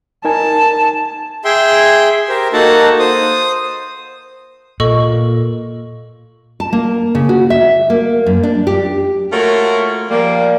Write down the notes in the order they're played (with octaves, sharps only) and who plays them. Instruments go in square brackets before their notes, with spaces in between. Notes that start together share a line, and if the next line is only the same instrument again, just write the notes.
[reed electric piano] D#4 A#4 G#5 [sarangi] A5
[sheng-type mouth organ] G#4 E5 G5 C6
G4 A#4 C5
A#3 D#4 F#4 A4 F#5 A5
C5 D#6
[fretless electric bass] A#2 [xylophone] A4 D#5 C#6
[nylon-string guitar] A5
A#3
C#3
F#4
E5
A#3
F#2
D4
G4
[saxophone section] A3 A#3 F4 F#4 A#4 C#5
F3 G3 A#3